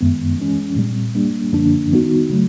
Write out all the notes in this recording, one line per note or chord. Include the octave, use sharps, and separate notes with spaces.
F#2 D#3 G#3 B3
E3 G#3 C#4
A#2 G3 C4
G3 A#3 D4
F#2 D3 F3 A#3 D4
D#3 G3 B3 D#4 F#4
C#3 F#3 A3